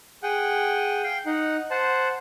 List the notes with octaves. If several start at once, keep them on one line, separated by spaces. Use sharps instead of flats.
G#4 F#5 G5
F5 G5
D#4 F#5
C5 F#5 A5